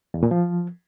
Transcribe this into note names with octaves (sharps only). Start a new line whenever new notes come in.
E2
A#2
F3